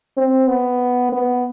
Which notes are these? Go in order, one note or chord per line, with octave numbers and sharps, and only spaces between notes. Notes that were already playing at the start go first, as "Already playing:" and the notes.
C4
B3
B3